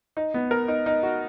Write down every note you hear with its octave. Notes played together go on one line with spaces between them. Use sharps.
D#4
B3
A#4
D#4
D#4
F#4